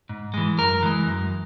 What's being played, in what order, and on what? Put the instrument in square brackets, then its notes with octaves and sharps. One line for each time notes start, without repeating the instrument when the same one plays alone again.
[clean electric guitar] G#2
E3 G#3
F#2 A#4
E3 G#3
F#2